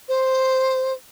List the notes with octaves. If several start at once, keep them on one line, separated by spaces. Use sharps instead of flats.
C5